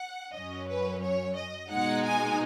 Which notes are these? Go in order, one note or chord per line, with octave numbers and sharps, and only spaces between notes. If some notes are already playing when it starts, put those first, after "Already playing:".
Already playing: F#5
F#2 F#3 C#4 D#5
B4
C#5
D#5
B2 G#3 D#4 F#5
G#5